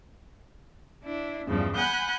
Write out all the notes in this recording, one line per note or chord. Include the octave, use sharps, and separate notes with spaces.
D4 E4
E2 G2 C#3 F3 G3
F#5 G#5 B5 F#6 G6